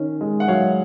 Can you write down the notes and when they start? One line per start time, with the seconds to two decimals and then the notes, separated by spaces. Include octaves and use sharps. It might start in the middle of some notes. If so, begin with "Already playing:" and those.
Already playing: D#3 C#4
0.21 G#3
0.40 F#5
0.48 F#3 C#5 F5